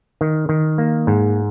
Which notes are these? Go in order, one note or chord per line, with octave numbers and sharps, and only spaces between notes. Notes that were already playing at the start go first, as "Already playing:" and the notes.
D#3
D#3
A#3
G#2